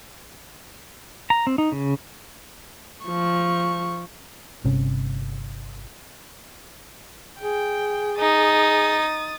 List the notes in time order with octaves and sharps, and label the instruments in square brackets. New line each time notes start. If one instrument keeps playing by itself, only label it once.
[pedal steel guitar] A#5
C4
D#4
C#3
[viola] F3 C#6
[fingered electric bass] G1 C3 C#4
[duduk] G#4 [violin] G5
[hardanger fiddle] D#4 [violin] D#6 A6